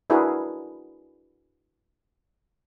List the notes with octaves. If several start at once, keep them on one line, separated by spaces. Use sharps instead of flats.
D4 E4 F#4 G#4 A#4 B4